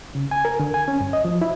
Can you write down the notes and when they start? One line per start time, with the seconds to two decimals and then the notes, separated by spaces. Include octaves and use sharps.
0.15 C#3
0.31 G#5
0.45 A#4
0.60 D3
0.74 G#5
0.88 C#4
1.01 G2
1.13 D#5
1.25 F3
1.41 E4